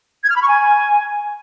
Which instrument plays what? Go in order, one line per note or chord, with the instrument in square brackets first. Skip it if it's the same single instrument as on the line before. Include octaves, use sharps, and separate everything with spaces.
[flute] G#6
F6
B5
C#6
G#5